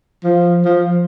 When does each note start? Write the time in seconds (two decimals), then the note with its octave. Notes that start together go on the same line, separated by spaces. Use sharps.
0.24 F3
0.65 F3